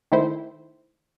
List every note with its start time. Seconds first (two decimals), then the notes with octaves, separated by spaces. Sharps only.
0.12 D#3 A3 E4 C5